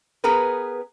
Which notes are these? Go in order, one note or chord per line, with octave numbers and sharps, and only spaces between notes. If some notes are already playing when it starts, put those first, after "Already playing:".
B3 G#4 A#4 B4